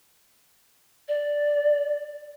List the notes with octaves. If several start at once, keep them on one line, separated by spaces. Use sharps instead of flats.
D5